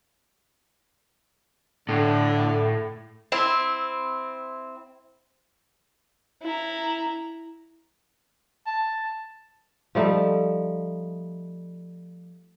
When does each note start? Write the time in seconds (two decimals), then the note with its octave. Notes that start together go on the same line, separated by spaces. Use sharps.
1.89 A2 D3
3.32 C4 E4
6.42 E4 A#5
8.66 A5
9.95 F3 G3 A3 D#4